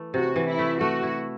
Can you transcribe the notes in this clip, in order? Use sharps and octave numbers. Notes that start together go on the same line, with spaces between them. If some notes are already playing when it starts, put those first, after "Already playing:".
Already playing: E3 A3
C3 F#4
E3
E4
A3
A3 F#4
E4